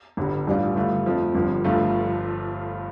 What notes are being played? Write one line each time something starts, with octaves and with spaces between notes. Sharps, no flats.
G1 G2 D3 G3
A1 G2 G3 D4 F4
G2 D3 A3 F4
F2 F3 A3
G1 G2 F3
G1 G2 F3 A3 F4